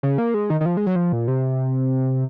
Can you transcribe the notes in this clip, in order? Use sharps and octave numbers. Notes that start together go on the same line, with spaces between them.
C#3
A#3
G#3
D#3
D#3
F3
G#3
F#3
F3
A#2
C3